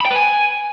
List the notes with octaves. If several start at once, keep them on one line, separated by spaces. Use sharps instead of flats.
B5
G5
B4
G#5